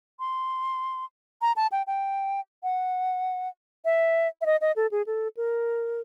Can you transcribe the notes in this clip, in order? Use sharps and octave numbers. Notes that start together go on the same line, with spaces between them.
C6
A#5
A5
G5
G5
F#5
E5
E5
D#5
D#5
A4
G#4
A4
A#4